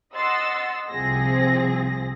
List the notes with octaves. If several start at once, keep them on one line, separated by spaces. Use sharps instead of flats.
D#5 F#5 C6 E6 A6
C2 C3 F3 C4 G#4 A#6